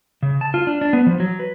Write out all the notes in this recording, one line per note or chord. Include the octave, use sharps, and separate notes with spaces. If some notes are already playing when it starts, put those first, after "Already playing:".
C#3
A5
F4
D4
D4
B3
F3
F#3
B4